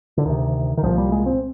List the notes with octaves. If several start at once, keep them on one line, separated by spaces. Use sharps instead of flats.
D3
D2 C3 D#3
D#3
C2 A#2 F3
G3
G#3
C4